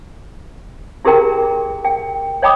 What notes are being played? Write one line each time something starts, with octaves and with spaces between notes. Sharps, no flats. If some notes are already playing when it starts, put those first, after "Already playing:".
E4 G4 G#4 A#4 G5 A#5
G5
C#5 D#5 G5 B5 D6 D#6